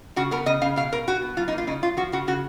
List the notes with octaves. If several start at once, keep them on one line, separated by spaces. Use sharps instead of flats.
C#3 F#4
B3 A#4
C#3 D#5
C#3 F5
B2 F5
B2 A#4
B2 F#4
B3
F#3 F4
D#4
A#3
F4
C#3 D#4
F#3 F4
F3 F#4
C#3 F#4
C#3 F#4